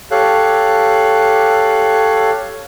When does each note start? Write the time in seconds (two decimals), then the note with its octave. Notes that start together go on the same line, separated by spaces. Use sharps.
0.11 G4 A4 C#5 F5 F#6